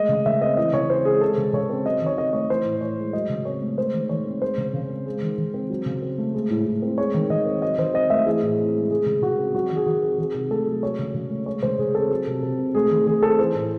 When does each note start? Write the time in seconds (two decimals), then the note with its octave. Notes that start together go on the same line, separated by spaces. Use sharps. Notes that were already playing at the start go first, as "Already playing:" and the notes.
Already playing: G#3 A3 D#5
0.09 C#3
0.26 C#3 E5
0.41 C4 D#5
0.57 E3 D#5
0.73 C#3 C#5
0.89 C4 C5
1.05 G#3 G#4
1.21 G#3 A4
1.38 C#3
1.53 C#3 C#5
1.70 C4
1.85 F#3 D#5
2.01 D#3
2.06 C#5
2.18 C4 D#5
2.33 A3 C#5
2.50 E3 C5
2.65 A2
2.81 A2 C#5
2.98 G#3
3.13 F#3 D#5
3.29 C#3
3.45 C4 C#5
3.62 A3
3.78 G#3 C5
3.94 D#3
4.09 D#3 C#5
4.25 C4
4.42 G#3 C5
4.58 C#3
4.74 C#3
4.89 C4
5.06 G#3
5.22 D#3
5.38 D#3
5.54 C4
5.70 F#3
5.86 C#3
6.02 C4
6.18 A3
6.34 G#3
6.50 A2
6.66 A2
6.82 C4
6.98 G#3 C#5
7.14 D#3
7.30 D#3 D#5
7.46 C4
7.62 F#3 D#5
7.78 D#3 C5
7.94 C4 D#5
8.10 A3 E5
8.26 E3 G#4
8.43 A2
8.59 C4
8.74 G#3
8.90 G#3 G#4
9.06 C#3
9.22 C#3 F#4
9.38 C4
9.55 F#3 F#4
9.71 D#3
9.76 G#4
9.86 D#3 F#4
10.02 C4
10.18 D#3 G#4
10.34 C3
10.51 A3 A4
10.66 F#3
10.83 F#3 C#5
10.99 C#3
11.14 C#3
11.31 A3
11.46 G#3 C#5
11.63 C#3 C5
11.79 C#3 G#4
11.95 C4 A4
12.10 F#3
12.27 C3
12.43 C3
12.59 C4
12.75 A3 G#4
12.91 D#3
13.07 D#3 G#4
13.23 C4 A4
13.38 E3 C5
13.55 A2